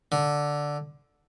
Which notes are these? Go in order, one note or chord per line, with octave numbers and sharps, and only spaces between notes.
D3